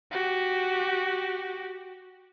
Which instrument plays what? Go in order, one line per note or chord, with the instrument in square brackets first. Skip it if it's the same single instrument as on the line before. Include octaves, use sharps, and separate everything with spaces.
[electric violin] F#4 G4